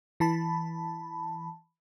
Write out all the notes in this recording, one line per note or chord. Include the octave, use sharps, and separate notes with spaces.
E3 A5 B5